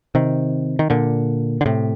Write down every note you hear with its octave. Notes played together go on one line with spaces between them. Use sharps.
C3 D#3
D#3
A#2 D3
D3
A2 C3